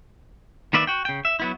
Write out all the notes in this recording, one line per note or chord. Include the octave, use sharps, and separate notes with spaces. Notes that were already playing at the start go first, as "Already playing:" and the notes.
D#3 A#3 B4 D5 E5
F#4 G5
C#3 G5
E5
F#3 B3 E4